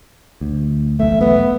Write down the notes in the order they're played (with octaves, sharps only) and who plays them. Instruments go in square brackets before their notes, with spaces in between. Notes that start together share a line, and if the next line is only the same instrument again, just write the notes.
[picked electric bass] D2
[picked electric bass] E1 B1 A3 [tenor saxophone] E5
[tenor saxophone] B3